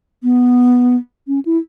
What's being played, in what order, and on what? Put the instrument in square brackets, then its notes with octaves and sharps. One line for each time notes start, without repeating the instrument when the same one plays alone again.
[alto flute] B3
C#4
E4